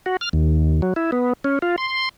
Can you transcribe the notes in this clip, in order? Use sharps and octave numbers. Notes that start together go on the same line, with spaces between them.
F#4
F6
D#2
F#3
E4
B3
C#4
F4
C6